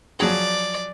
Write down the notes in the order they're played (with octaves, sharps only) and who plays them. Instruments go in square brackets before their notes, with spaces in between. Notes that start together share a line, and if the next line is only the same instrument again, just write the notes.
[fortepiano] F3 F#3 G#4 [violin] D5